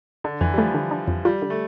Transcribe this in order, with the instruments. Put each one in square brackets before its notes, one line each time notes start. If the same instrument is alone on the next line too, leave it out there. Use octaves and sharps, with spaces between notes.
[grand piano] D3 [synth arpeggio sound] D4
[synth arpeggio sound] F2 [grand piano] E3
[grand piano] G3
[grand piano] F3 [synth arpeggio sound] A3
[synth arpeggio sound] D3
D4
F2
[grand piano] G3 [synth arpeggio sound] F4
[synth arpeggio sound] D3
[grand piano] A3